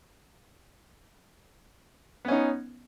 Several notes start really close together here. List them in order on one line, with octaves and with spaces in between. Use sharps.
B3 C#4 D#4